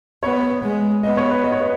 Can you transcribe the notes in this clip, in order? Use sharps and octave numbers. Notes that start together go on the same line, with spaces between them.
B3 C#5
G#3
B3 D#5
C#5
B4
D#5
C#5
B4